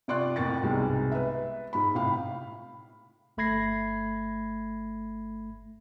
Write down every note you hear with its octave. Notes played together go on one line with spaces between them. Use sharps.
C3 F4 D5 C6 C#6 F#6
F2 A2 A#3 A#4 C#6 A6
C2 G#2 B2 G3 G#3
B4 E5
G#2 B5
A2 C3 F5 B5
G1 A3 B5 G#6 A#6 C7